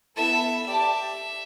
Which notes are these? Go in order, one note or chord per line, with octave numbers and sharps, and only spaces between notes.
B3 E4 A4 E5
G4 D5 E5 A5